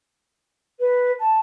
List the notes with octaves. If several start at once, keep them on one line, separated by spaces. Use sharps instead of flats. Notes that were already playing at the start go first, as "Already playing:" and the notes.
B4
A5